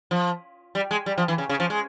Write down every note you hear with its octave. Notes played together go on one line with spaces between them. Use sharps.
F3
G3
G#3
G3
F3
E3
C#3
C#3
F3
G#3